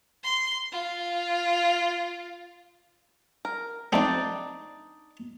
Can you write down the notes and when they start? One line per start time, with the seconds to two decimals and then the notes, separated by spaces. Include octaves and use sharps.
0.24 C6
0.72 F4
3.45 A#4
3.92 F3 A3 C4 D4 D#4 D5